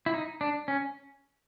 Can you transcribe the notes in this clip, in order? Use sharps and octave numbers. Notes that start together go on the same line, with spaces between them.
E4
D#4
D4
C#4